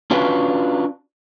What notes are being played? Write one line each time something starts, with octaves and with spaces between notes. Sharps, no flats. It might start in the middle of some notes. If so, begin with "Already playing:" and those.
C#4 D4 F4 F#4 B4